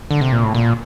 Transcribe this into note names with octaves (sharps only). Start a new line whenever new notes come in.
D3
C3
A#2
A2
A#2